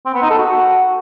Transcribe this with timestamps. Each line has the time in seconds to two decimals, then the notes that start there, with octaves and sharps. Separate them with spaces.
0.05 C4
0.14 B3
0.22 D#4
0.30 A4
0.38 F#4